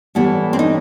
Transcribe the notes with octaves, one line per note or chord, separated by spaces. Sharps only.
A2 E3 G3 B3
C4
D#4